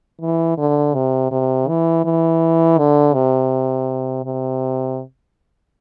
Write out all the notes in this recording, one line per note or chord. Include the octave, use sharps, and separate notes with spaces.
E3
D3
C3
C3
E3
E3
D3
C3
C3